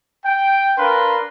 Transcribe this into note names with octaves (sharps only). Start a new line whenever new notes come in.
G5
D4 A#4 B4 F5 C6